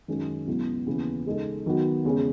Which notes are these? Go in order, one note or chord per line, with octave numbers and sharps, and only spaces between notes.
F#2 D#3 G#3 C#4
C#2 B2 F#3 B3 E4
D#2 C#3 E3 B3
C#3 G#3 D#4 A4
D#3 F#3 B3 F#4
E2 C#3 G#3 C#4 G#4